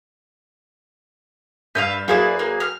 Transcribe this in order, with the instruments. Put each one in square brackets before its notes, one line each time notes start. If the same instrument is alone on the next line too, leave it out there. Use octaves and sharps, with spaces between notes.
[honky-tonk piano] G2 G6 [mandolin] B4 E5 F5
[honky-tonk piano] F#3 G#4 B4 [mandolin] A#3 E4 D5
[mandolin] A#3
F6